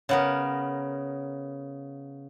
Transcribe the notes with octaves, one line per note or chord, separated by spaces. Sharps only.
C#3 B3 A#4